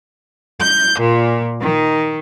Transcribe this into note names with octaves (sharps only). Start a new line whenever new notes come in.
G6
A#2
D#3